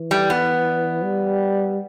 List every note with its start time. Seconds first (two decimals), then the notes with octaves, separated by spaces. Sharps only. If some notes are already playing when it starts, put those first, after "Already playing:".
Already playing: E3
0.11 G3
0.30 B3
1.03 G3